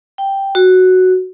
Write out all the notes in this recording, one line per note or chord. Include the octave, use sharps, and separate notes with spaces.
G5
F#4